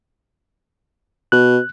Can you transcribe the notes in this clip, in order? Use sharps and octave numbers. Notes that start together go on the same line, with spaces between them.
B2 F#6